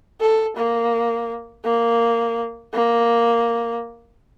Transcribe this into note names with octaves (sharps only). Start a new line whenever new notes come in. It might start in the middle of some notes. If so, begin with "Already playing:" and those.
A4
A#3
A#3
A#3